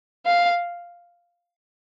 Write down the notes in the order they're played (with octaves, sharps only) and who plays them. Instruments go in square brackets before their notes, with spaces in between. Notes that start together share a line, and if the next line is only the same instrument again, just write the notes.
[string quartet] F5